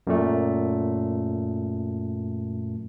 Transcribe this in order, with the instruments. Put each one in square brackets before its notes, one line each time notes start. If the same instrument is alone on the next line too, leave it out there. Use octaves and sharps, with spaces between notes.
[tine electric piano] F#2 A#2 A3